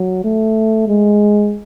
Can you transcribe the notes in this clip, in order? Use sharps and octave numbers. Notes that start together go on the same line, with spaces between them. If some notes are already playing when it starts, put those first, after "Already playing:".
Already playing: F#3
A3
G#3